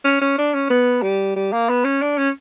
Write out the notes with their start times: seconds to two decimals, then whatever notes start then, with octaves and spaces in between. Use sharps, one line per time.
0.05 C#4
0.21 C#4
0.38 D4
0.54 C#4
0.70 B3
1.03 G3
1.36 G3
1.52 A#3
1.69 B3
1.85 C#4
2.02 D4
2.18 C#4